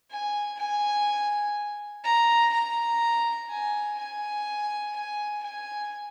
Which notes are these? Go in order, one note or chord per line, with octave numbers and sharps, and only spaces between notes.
G#5
G#5
A#5
A#5
G#5
G#5
G#5
G#5